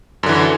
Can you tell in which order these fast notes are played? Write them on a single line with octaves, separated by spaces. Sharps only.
F#2 D3 E3